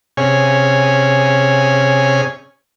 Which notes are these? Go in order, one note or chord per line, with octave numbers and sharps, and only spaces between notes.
C3 C#4 G#4 C#5 G#5